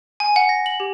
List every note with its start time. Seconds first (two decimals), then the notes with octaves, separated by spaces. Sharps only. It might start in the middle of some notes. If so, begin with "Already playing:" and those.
0.20 G#5
0.36 F#5
0.49 A#6
0.66 F#7
0.80 G4